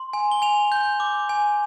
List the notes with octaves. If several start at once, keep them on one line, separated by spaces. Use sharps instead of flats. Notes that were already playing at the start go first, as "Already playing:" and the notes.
Already playing: C6
G#5
G7
G#5 F7
G6
D6
G#5